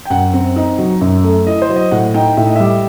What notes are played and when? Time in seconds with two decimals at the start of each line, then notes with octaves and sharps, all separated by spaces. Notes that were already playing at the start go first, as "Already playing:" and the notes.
0.05 G5
0.10 F#2 F#5
0.34 C4
0.56 D#4
0.79 F#3
1.01 F#2
1.24 A3
1.47 E4 D#5
1.62 C5
1.69 F#3
1.76 D#5
1.91 A2 F#5
2.14 D#4 G5
2.37 A2 E5
2.47 D#5
2.56 E5
2.60 G3